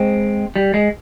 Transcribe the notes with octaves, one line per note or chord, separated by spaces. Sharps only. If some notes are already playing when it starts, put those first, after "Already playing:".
Already playing: G#3 C4
G3
G#3